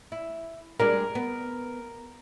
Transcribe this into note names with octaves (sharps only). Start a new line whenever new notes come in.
E4
G3 G#3 D4 A#4
B3